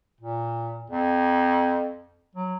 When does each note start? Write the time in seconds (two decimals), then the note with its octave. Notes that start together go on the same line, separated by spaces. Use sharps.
0.21 A#2
0.90 F2
2.36 F#3